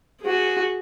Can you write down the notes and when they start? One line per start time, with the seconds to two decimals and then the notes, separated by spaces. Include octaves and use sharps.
0.21 F#4 G#4